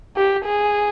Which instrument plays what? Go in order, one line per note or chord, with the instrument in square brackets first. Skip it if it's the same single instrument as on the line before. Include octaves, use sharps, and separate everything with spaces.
[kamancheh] G4
G#4